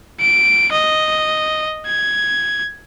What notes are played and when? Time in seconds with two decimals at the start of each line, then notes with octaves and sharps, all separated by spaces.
0.20 D7
0.72 D#5
1.87 G#6